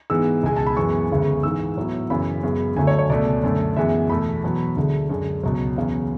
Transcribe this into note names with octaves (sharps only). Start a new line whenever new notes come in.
G#2 E3 G#3 B3 E6
C#2 B2 G#3 G#5
A5
B5
F#2 E3 G#3 B3 C#6
D2 C#3 G#3 B3
G#2 E3 G#3 E6
A2 F#3 B3
F#2 C#3 E3 B5
F#2 C#3 G#3 B3
D2 D3 F#3 A3 G#5
C#5
C#5
C#2 B2 A3 D5
F#2 D3 A3
F#2 E3 G#3 B3 E5
E2 B2 A3 B5
E2 B2 F#3 B3
D2 D3 G#3
F#2 D3 G#3
C#2 B2 F#3
E2 C#3 F#3 B3